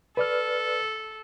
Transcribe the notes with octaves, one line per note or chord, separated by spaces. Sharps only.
A4 B4 D5 F6